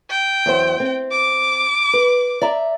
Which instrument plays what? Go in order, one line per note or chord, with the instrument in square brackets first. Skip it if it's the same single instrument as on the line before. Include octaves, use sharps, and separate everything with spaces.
[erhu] G5
[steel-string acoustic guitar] E2 F#3 C5
C4
[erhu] D6
[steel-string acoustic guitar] B4
D5 E5 A#5